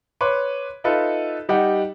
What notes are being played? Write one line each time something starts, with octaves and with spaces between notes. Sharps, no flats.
B4 C#5 C6 D6
D#4 F4 A4 B4 E5
G3 D#4 G4 F#5